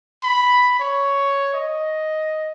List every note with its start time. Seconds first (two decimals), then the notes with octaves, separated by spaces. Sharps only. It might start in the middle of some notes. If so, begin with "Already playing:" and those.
0.23 B5
0.79 C#5
1.53 D#5